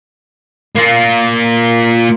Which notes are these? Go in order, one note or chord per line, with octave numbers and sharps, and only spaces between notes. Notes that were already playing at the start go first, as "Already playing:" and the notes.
A#3 F4